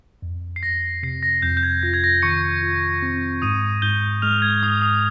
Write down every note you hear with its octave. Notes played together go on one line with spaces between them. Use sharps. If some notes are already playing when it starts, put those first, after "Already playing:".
F2
C7
F2 A#6
C3 C7
A#6
F2 G6
G6
G#6
F4 A#6
G#6
A#6
D#3 C#6 C#7
F4
C4
G#2 D#6 D#7
G#2 G6 G7
G#3 F6 F7
G#6
G#2 D#6
D#6